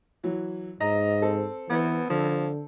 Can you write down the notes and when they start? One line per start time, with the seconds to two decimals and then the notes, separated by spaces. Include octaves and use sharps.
0.24 E3 F#3
0.81 G#2 D#5 A#5
1.22 C4 A4
1.70 E3 B3
2.10 D3 F3